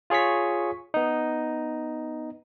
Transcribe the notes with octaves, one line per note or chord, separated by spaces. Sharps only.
F4 G#4 C#5 C#6 B6
B3 D#4